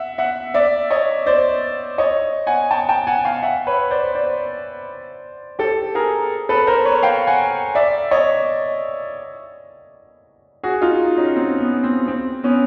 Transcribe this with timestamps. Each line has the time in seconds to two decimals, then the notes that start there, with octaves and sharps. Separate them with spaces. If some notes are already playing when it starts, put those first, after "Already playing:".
Already playing: E5 F#5
0.18 E5 F#5
0.54 D5 E5
0.91 C#5 D#5
1.26 C5 D5
1.98 C#5 D#5
2.47 F#5 G#5
2.71 G5 A5
2.89 G5 A5
3.07 F#5 G#5
3.25 F5 G5
3.43 E5 F#5
3.67 B4 C#5
3.91 C5 D5
4.15 C5 D5
5.59 G4 A4
5.95 G#4 A#4
6.49 A4 B4
6.67 A#4 C5
6.85 B4 C#5
7.03 F5 G5
7.27 F#5 G#5
7.75 D5 E5
8.11 C#5 D#5
10.63 F#4 G#4
10.81 D#4 F4
11.17 C#4 D#4
11.36 C4
11.59 B3
11.84 C4
12.08 C4
12.43 B3 C#4